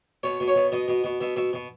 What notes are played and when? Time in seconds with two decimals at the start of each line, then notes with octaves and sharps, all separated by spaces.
0.23 B2 C#5
0.40 B2
0.48 C#5
0.55 B2
0.72 B2 D#5
0.88 B2
1.04 B2
1.21 B2 E5
1.36 B2 E5
1.53 B2